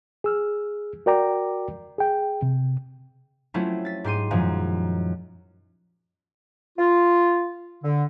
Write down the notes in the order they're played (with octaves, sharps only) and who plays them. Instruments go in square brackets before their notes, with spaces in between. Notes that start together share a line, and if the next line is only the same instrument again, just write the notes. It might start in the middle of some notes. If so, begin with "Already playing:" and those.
[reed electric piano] G#4 E6 F6
F#4 A#4 D5 G5 A#5 D6
G#4 G5
C3
[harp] F#3 A3 C4 C#4 E4 F4
A6 B6
G#2 G4 C6 D#7
F#2 A#2 D#3 F3 F#3 G#3
[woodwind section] F4
D3